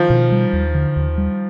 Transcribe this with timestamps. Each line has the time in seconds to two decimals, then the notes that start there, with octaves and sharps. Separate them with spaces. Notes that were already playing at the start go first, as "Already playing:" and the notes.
Already playing: D#3 F3
0.10 B2
0.32 G3
0.53 D#2
0.74 D3
0.96 D#2
1.18 G3